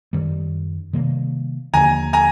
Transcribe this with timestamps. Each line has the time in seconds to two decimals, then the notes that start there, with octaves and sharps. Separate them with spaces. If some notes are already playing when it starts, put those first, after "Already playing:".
0.13 F#2 D#3 G3
0.93 C3 D#3 G3 A#3
1.74 D#2 D3 F3 A#3 G#5 A#5
2.13 G#5 A#5